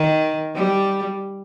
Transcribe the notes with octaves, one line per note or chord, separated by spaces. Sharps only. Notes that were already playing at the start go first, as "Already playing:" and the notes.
Already playing: D#3
G3